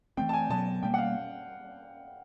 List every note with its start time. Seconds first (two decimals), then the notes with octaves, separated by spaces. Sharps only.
0.17 E3 A3 C4 G5
0.29 A5
0.33 G#5
0.50 B2 F#3 B3 A5
0.83 B2 G3 A#3 G5
0.94 F5 F#5